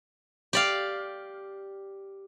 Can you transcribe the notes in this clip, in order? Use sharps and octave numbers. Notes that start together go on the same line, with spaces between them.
G4 D5 F5